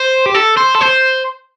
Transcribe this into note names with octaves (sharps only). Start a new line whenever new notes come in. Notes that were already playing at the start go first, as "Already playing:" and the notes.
Already playing: C5
G4
A4
C5
A4
C5